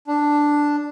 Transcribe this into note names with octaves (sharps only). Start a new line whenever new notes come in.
D4